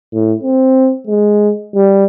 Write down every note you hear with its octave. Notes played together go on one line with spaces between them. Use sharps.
A2
C4
G#3
G3